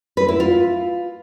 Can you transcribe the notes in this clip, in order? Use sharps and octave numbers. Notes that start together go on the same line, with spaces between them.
B4
E4
F4